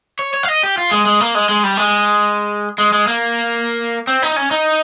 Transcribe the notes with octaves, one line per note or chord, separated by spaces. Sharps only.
C#5
C#5
F5
D#5
G4
F4
G#3
G#3
A#3
G#3
G#3
G3
G#3
G#3
G#3
A#3
C4
D#4
C#4
D#4